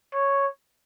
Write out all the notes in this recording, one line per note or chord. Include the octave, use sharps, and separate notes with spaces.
C#5